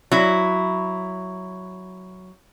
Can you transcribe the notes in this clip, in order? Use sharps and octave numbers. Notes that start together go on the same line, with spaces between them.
F#3 E4